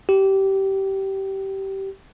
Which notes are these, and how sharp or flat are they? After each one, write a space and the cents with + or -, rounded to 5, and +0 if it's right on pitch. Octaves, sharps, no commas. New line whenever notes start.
G4 -20